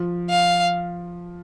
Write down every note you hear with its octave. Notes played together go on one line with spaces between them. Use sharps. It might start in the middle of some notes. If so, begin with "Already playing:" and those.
Already playing: F3
F5